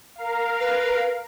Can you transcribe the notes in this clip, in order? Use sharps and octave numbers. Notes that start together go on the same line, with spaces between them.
A#4 F5
B4